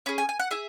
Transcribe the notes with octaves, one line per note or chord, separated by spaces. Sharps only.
C#4 G#4 B5
G#5
G#5
F#5
E4 G#4 E5